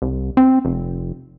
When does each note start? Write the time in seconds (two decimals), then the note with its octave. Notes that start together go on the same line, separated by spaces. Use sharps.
0.02 C2
0.37 C4
0.65 F1